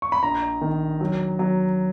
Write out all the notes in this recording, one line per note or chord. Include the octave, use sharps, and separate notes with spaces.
C#6
B5
A#1 A#5
D#3
F#3
F#3